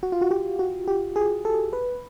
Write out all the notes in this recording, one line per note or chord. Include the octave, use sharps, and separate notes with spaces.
F#4
F4
F#4
G4
F#4
G4
G#4
A4
B4